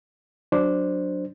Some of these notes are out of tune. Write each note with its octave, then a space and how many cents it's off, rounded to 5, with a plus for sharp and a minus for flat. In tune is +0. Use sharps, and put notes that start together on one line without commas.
F#3 +0 D4 +0 C5 +0